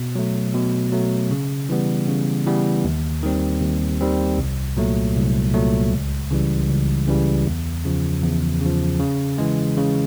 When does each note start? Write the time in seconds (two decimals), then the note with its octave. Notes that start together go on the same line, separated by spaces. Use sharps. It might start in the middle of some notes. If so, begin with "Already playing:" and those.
Already playing: B2
0.15 F#3 A3
0.54 B2
0.92 F#3 A3
1.31 C#3
1.69 E3 G3 B3
2.08 C#3
2.46 E3 G3 B3
2.84 D#2
3.23 D#3 G3 C4
3.62 D#2
4.01 D#3 G3 C4
4.38 C2
4.77 A#2 F#3 A3
5.16 C2
5.54 A#2 F#3 A3
5.92 C#2
6.31 C#3 E3 G3
6.69 C#2
7.07 C#3 E3 G3
7.46 E2
7.85 C#3 F3
8.23 E2
8.61 C#3 F3
8.99 C#3
9.38 E3 G#3
9.77 C#3